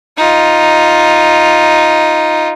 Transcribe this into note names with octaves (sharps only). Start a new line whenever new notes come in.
D#4 F4